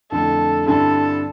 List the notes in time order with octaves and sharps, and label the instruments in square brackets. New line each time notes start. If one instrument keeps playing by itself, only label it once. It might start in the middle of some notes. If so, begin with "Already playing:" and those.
[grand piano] F2 D3 A3 E4 [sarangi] A4
[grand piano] G2 D3 G3 C4 E4 [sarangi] A4